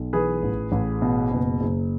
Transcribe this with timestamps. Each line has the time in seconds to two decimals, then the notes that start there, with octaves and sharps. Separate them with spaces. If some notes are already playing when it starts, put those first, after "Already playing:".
Already playing: B1
0.13 E3 G#4 B4
0.43 A1
0.72 A1
1.02 B2
1.32 F#1
1.61 F#1